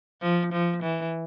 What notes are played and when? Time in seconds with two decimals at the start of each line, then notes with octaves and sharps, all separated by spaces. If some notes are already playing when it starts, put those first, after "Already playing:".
0.22 F3
0.53 F3
0.83 E3